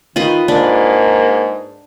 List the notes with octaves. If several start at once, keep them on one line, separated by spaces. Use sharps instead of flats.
D#3 F4 B4 D#5
G#2 A#3 D4 B4